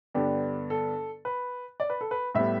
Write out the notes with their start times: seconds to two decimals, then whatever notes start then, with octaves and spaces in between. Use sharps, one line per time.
0.15 G2 D3 B3 D4 G4
0.70 A4
1.25 B4
1.80 D5
1.90 B4
2.01 A4
2.11 B4
2.35 A2 G3 B3 E5